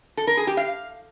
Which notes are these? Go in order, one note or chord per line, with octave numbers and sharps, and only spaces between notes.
A4
A#4
G#4
G4
F5